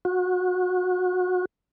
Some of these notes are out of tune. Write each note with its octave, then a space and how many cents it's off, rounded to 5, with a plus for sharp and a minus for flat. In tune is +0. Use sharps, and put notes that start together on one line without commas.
F#4 -25